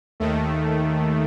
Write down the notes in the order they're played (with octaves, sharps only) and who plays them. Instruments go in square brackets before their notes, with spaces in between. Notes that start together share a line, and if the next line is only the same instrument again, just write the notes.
[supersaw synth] D#2 D#3 A3